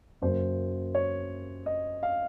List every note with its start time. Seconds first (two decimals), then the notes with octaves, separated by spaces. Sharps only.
0.22 F#2 C#3 F#3 A#3 C5
0.95 C#5
1.66 D#5
2.03 F5